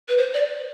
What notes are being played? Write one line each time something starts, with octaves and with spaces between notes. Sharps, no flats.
B4
C5
D5